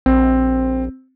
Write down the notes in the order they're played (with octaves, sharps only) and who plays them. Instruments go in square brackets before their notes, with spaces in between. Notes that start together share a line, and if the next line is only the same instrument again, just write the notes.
[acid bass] A#1 [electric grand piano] C4